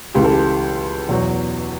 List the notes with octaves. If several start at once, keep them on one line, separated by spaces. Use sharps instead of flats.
C#2 C#3 E3 G4
A4
G4
E2 B2 F#3